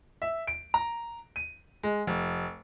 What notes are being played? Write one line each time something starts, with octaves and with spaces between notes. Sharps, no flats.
E5
D7
A#5
D#7
G#3
F1